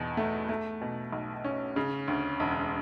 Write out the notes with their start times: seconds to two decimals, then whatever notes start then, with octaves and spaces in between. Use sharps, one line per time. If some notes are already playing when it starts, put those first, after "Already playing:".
Already playing: E2 B2
0.17 A3
0.49 A3
0.81 B2
1.13 B1
1.44 C#4
1.76 C#3
2.08 D2
2.40 E1